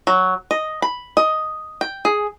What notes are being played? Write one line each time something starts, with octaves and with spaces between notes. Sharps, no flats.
F#3
D#5
B5
D#5
G5
G#4